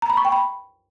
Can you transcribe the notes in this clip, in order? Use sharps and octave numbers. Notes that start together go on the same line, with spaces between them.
A#5
B5
C#6
G5
B5